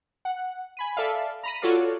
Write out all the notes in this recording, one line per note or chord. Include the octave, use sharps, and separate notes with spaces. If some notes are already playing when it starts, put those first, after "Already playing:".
F#5
G#5 B5 D#7
A4 D5 E5 F5
A#5 B5 D#7
F4 F#4 A4 C#5 D5 F5